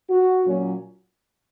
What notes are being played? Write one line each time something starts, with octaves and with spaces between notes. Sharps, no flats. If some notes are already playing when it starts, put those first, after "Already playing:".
F#4
A#2 F#3 C#4